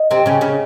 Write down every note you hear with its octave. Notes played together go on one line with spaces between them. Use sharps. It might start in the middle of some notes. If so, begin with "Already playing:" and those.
Already playing: D#5
C3 C4
C#3 C#4
C#3 C#4